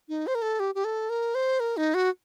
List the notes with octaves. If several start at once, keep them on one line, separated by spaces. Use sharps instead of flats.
D#4
C5
A#4
A4
G4
G4
A4
A#4
C5
A#4
D#4
F#4